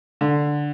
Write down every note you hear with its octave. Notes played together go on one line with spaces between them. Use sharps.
D3